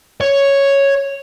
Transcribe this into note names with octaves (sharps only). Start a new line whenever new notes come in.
C#5